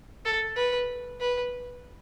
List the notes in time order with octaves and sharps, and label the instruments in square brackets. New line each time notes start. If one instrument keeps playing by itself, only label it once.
[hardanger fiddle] A4
B4
B4